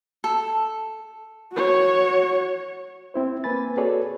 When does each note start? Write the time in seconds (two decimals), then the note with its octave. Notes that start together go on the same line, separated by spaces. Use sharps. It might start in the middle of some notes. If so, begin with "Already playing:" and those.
0.24 A4
1.53 F#4 C#5
3.14 C4 E4 C5
3.44 A#3 C4 B4 G#5 B5 A6
3.77 F#4 G#4 A4 B4 C#5 D5